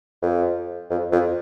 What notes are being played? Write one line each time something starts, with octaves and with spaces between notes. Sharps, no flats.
F2
F2
F2